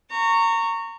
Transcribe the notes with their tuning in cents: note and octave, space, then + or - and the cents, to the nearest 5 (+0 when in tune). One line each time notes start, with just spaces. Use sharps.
A#5 -25 C#6 +0